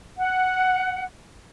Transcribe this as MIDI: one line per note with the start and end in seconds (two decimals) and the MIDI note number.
0.18 1.03 78